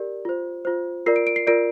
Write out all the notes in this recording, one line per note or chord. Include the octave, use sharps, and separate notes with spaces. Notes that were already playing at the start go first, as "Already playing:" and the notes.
Already playing: G4 A#4 D5
F4 C5
F4 C5
F4 A#4 D5 C7
D7
D7
C7
F4 A#4 D5 D7